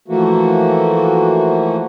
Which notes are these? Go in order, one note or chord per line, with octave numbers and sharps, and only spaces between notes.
E3 F3 A3 A#3 F#4